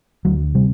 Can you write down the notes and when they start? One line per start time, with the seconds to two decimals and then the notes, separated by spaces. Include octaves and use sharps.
0.25 D2 F#3
0.55 C3 G3